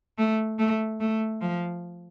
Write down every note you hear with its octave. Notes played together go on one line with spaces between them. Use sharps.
A3
A3
A3
F3